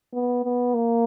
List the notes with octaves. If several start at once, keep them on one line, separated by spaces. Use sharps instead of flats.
B3
B3
A#3